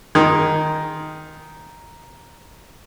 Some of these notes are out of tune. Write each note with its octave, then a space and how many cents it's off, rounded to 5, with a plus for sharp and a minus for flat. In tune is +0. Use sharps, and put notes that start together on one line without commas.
D#3 +0 G#4 +0 C6 +15